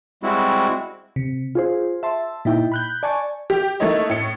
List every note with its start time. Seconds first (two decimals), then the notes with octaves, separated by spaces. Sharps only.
0.23 G3 G#3 C4 E4 F#4
1.16 C3
1.55 F4 G#4 C5
2.03 E5 A5 C6
2.45 A#2 D#4 E4 G5
2.72 B5 F#6 G6
3.03 D5 G#5 A5 C#6
3.50 G4
3.80 A3 A#3 D#4 E4 C#5 D#5
4.10 A2 C#7